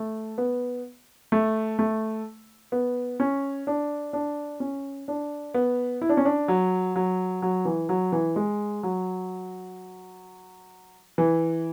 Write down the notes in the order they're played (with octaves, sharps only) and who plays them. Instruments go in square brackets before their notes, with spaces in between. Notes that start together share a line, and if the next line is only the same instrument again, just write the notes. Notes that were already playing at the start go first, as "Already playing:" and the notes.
Already playing: [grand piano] A3
B3
A3
A3
B3
C#4
D4
D4
C#4
D4
B3
E4
D4
C#4
D4
F#3
F#3
F#3
E3
F#3
E3
G#3
F#3
E3